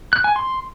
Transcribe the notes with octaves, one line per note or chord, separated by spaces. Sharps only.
F#6
G#5
C6